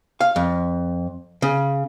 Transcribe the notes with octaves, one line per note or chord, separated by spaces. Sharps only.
F5
F2
C#3